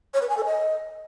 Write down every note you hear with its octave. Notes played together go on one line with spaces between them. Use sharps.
C#5
B4
G#5
A4
D#5